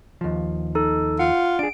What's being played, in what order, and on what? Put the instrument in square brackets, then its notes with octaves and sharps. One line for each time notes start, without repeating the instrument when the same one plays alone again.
[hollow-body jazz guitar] D#2 F3
[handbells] D#4 A4
[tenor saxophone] F4 [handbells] F#5
[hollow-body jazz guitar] D4 G#4 [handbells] D7